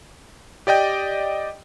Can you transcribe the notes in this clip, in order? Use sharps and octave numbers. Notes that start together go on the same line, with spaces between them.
G4 D5 D#5 G5